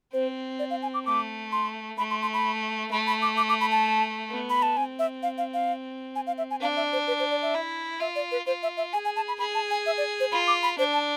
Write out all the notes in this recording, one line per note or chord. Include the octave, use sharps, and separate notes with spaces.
C4 C5
D5
F5
G#5
D6
A3 D6
C6
A3 B5
C6
C6
B5
A3 B5
B5
D6
D6
D6
B5
A5
B3
B5
A5
C4 G#5
E5
F5
F5
F5
G#5
F5
E5
G#5
D4 F5
E5
C5
B4
C5
D5
E5
E4
F4 E5
D5
B4
F4 C5
E5
E5
G#4 G#5
G#5
A5
B5
G#4 B5
A5
G#5
E5
D5
C5
F4 B5
D6
B5
D4 C5
A5